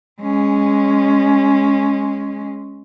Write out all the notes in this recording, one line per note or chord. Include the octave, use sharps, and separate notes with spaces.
G#3 C#4